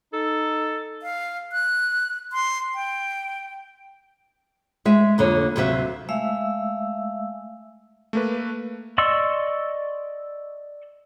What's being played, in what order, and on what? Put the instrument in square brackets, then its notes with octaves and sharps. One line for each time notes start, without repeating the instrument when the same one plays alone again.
[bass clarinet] D#4 [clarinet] A4
[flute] F5
F#6
C6
G5
[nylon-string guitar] G#3 E5
F2 D3 A#3 C#5
D2 C3 F#3 E5 F5
[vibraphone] G#3 A3 E5 F5 E6
[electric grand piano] A3 A#3 B4
[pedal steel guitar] D5 D#5 C6 C#6 E6